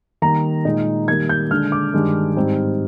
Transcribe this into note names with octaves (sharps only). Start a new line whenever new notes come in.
D#3 G3 A#3 A#5
A#2 G#3 D#4
D#3 G3 A#3 G#6
G6
D3 G#3 D4 F6
D6
G2 D#3 G#3 D4
G#2 G3 C4 D#4